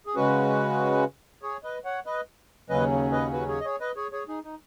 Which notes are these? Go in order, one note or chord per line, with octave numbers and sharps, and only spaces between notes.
G#4
C#3 G#3 C#4 F#4 B4
G#4 C#5
B4 D#5
C#5 F#5
B4 D#5
D#2 C#3 F#3 C#4 B4 D#5
B4 D#5
F#4 B4
G#4 C#5
D#5
G#4 C#5
B4 D#5
G#4 C#5
G#4 C#5
D#4 G#4
D#4